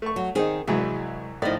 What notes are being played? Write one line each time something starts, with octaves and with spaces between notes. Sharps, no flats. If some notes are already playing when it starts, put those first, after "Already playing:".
A3 C#6
F#3
D#3 C4 D#4 G#4
C2 E3 F#3 G#3
A2 D#3 F3 D5 D#5